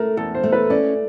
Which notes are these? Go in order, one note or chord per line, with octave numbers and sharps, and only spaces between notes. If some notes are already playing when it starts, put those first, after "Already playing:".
Already playing: A3 A#4
E2 A4
C5
A3
B4
C#4 D5